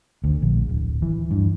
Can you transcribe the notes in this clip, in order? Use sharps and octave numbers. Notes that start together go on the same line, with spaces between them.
D2
A#1
D1
E3
G2